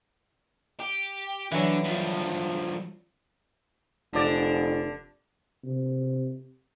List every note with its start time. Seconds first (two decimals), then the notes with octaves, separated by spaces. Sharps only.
0.80 G4
1.52 D3 E3 F#3
1.85 G2 F3
4.13 F1 D3 D5
5.64 C3